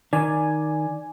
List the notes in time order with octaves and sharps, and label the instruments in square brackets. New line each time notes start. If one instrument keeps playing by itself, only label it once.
[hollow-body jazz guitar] D#3 [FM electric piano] D5 G#5